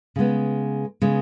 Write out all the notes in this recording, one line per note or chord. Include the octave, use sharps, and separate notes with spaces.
C#3 G#3 B3
C#3 G#3 B3